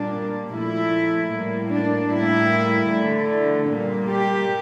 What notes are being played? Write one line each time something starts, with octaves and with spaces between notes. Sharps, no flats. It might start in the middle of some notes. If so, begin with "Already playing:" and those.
Already playing: A#2 G3 A#3 D4
A#2 F3 A3 E4
A2 G3 A#3
D4
A2 G3 A#3 E4
D3 A3
A#2 G3 A#3
G4